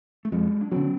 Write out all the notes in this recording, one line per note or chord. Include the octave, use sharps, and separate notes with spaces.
A3
F2 F#3 G#3
D4
D3 F#3 B3 C#4